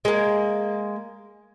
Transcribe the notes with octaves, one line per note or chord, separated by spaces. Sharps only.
G#3 A#3